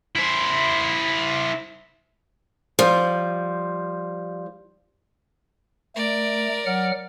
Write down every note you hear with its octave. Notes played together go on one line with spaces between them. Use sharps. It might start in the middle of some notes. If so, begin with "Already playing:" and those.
E4 C5
F3 G3
A3 A#4 D5
F#3 F#5 F6